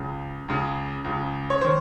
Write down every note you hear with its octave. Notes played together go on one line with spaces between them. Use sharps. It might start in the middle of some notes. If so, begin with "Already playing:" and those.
Already playing: C#2 C#3
C#2 C#3
C#2 C#3
C#5
D#3 C5